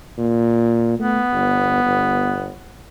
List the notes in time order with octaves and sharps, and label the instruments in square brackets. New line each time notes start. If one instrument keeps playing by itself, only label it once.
[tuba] A#2
[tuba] A3 [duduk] B3
[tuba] G1
G1